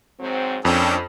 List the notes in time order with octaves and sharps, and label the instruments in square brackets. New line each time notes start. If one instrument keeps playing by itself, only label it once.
[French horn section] G#2 F#3 C4
[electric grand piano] F2 [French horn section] F3 A#3 D4 [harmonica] C#4 A4 G5